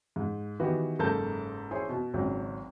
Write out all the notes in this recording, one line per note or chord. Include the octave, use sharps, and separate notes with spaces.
G#2
D#3 E3 B3 F#4 G4 B4
F#1 G#2 A4 A#4 A5 G6
E4 G#4 C5 C#5
B2
G#1 C#2 F#3